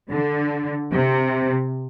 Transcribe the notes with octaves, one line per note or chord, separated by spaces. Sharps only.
D3
C3